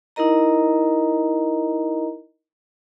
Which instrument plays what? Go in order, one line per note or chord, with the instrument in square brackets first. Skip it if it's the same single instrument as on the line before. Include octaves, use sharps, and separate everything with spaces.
[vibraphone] D#4 E4 A#4 D#5 A#5